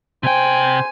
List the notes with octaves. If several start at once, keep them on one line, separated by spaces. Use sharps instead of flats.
C3 C5 G5 G#5